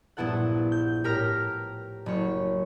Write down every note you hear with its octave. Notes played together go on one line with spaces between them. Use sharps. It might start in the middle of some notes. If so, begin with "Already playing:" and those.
A#1 G2 B3 E4 A4 F#5
G6
A2 G4 A#4 A#5 F6
F#1 C#5